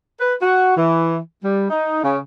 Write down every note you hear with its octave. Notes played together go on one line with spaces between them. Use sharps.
B4
F#4
E3
G3
D#4
C#3